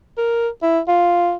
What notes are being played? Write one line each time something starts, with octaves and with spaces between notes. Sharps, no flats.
A#4
E4
F4